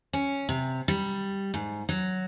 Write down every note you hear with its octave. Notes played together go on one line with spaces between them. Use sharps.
C#4
C3
G3
G#2
F#3